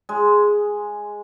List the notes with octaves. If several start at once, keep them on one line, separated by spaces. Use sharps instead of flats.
G#3